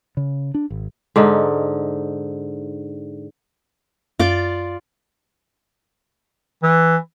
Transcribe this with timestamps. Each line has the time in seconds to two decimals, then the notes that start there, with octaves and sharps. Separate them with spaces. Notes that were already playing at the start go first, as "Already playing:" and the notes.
0.17 C#3
0.54 D4
0.70 G#1
1.16 G#2 D3 D#4
4.20 F#2 F4 D5 D6
6.63 E3